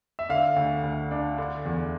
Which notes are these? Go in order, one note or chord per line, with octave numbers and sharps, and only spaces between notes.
E5
D3 F5
D2
D2
D4
D3
E2